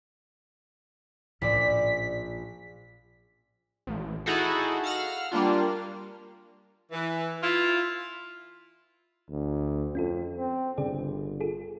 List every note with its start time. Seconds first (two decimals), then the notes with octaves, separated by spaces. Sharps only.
1.42 A#1 A2 C#4 C5 D5 B6
3.87 A1
4.26 D#4 E4 F#4 G#4 A4
4.84 F5 F#5 E6 F6 A#6
5.32 G3 A#3 D4 F4
6.92 E3
7.41 E4 F4
9.30 D2
9.95 F2 C#4 F4 A4
10.37 C4
10.78 G1 C#3 G#4 D5
11.40 F4 G#4 A4